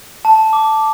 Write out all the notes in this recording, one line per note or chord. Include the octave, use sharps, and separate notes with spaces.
A5
D6